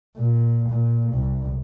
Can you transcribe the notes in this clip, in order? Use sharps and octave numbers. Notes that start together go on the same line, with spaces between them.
A#2
A#2
C2